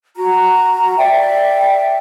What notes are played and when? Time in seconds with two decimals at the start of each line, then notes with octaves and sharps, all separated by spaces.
0.16 F#4 A#5
0.98 D5 E5 G5